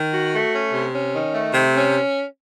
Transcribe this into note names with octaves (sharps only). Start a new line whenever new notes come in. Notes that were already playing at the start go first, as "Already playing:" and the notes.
Already playing: D#3
F#4
A3
C#4
C3
C#4
D#3
A3
C3
C#4